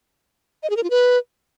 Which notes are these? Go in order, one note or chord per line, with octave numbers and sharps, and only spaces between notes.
D#5
G#4
A#4
F4
B4